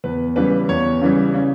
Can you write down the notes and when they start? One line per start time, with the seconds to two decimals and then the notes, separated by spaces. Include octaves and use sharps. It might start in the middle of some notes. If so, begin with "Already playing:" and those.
0.04 E2 B4
0.36 C#3 E3 G3 B4
0.69 E2 C#5
1.02 C#3 E3 G3
1.34 C#3